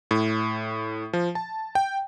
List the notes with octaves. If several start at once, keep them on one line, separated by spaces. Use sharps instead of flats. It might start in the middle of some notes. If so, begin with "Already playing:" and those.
A2
F3
A5
G5